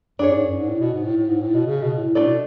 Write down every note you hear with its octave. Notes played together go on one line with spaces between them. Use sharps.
F#2 D4 G#4 C#5
G#2
F#2
G#2
A2
B2
G#2
A2
A2
G#2
A2
B2
C#3
B2
A2
A2 A3 D4 A4 D5
B2